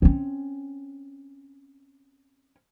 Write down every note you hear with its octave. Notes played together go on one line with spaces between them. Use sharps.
C4 C#4